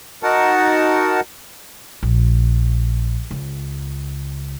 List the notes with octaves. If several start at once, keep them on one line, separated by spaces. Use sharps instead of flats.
D#4 F#4 A#4 F#5 A5
A#1
C#2